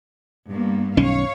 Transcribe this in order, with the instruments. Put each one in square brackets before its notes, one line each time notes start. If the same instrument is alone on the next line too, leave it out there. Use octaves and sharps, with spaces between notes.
[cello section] G2 A#3 B3
[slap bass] B1 D#3 C#4 [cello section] C#5 F5